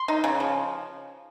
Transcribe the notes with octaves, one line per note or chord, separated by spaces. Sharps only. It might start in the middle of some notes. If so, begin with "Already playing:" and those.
Already playing: C6
D#4
C#3
F3